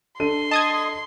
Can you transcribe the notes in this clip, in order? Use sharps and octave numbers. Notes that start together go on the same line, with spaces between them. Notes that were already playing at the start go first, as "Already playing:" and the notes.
D4 A4 C6 D#7
D#5 A5 D#6 G#6